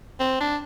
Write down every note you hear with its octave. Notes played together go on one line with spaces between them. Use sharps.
C4
D4